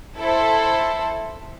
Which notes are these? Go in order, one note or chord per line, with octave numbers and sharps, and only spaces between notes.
E4 A4 C5